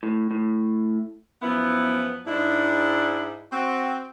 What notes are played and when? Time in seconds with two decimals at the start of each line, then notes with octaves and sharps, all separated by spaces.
0.03 A2
0.31 A2
1.42 F#2 F3 B3 E4
2.27 G#2 D4 E4
3.52 C4 F#4